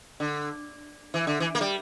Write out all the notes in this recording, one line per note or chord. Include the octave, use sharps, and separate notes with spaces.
D3
E3
D3
E3
A#3
G3